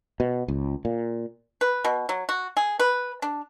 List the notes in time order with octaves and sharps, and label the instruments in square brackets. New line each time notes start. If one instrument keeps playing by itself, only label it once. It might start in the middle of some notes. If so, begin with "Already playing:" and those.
[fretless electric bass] B2
C#2
A#2
[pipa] B4
B2
F#3
F#4
G#4
B4
D4